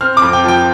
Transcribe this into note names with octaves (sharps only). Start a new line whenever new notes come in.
C4 F6
F2 D6
G5
F3 G5